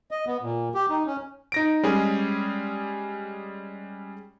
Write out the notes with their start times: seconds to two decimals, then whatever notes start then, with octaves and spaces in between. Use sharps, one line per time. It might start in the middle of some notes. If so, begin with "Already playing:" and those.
0.11 D#5
0.27 B3
0.42 A#2
0.74 G4
0.89 D#4
1.06 C#4
1.52 D#4 A#6 D7
1.83 G3 G#3 C#4 G#4